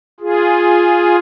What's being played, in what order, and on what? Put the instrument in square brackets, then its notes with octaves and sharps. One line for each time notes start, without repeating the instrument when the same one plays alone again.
[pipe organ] F4 G#4